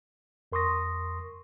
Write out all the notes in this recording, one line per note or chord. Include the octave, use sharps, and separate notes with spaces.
F2 A#4 C6 C#6 D#6 A#6